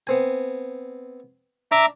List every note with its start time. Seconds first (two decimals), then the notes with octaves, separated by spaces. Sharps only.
0.07 B3 C4 G#5
1.71 D4 E5 A#5 D6